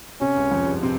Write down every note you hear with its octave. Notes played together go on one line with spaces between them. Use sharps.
C3 C#4
C#2 C#3
F2 F3
G#3
G2 G3
C3 C4